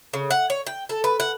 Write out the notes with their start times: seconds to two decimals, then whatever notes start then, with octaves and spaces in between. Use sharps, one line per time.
0.14 C#3
0.31 F#5
0.50 C#5
0.67 G5
0.89 A4
1.04 B4
1.20 F#5